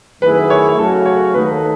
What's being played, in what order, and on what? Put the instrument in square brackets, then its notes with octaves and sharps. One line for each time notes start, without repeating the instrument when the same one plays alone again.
[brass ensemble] F#2 D#3 A3 E4 G#4 [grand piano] B4
[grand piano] C#5
[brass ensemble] C#3 F#3 A3 C#4 F#4 [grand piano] A4
[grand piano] C#5
[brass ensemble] D#2 D#3 A3 D#4 A4 [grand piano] B4